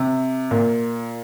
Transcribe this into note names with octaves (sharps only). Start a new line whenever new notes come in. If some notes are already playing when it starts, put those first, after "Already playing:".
Already playing: C3
A#2